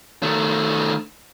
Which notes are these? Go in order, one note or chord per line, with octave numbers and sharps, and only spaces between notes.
D#3 A3